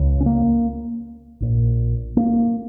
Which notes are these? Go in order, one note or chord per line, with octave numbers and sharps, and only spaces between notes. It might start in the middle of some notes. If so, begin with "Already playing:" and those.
Already playing: C#2 C#3
C#4
A#3
A#1 A#2
A#3